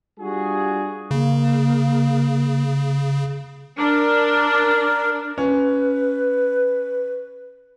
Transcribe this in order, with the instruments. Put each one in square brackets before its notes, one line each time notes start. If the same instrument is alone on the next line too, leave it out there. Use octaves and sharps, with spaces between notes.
[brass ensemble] G3 D4 F4 F#4 G#4
[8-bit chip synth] C#3 [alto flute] A#3
[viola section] D4 [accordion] A#4
[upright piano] C#4 [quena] B4